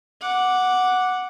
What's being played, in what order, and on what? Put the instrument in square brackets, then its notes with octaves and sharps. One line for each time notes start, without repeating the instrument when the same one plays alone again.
[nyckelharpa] F#5 D6